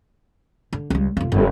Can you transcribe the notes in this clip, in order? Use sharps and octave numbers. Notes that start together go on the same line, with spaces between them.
D3
C#2 G3
F1 F4
F#1